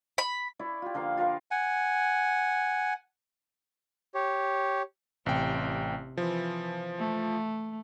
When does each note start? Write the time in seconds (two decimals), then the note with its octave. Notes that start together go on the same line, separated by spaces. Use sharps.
0.18 B5
0.59 E4 D5 C#6
0.82 F4 G4
0.94 D3 F3 A#3 F5
1.17 F4 A#4 B4 F5
1.51 F#5 G#5
4.15 G4 C#5
5.26 A1 C3 G5
6.17 E3 F3
6.99 A3